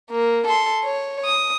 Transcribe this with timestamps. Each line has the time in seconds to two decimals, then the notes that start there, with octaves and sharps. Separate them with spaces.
0.11 A#3
0.48 A4 C6
0.84 C#5
1.25 D#6